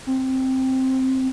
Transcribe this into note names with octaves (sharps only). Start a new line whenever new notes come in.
C4